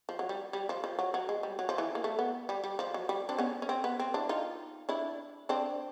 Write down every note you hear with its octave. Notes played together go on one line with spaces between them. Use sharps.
F3
F#3
G3
G3
F3
F3
F#3
F#3
G#3
G3
F#3
F3
E3
A#3
A3
B3
G3
G3
F3
F#3
G3
C4 D4
B3 C#4
C#4
C4
B3
C4
D4 E4
D#4 F4
D4 E4
C4 D4